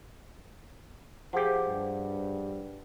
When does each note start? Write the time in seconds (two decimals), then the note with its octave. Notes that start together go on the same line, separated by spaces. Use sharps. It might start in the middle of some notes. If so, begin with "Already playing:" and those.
1.33 F3 G4 G#4 C5 F#5
1.68 G2